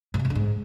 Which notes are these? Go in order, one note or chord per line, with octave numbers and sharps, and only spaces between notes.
A#2
C3
F2
D3
G#2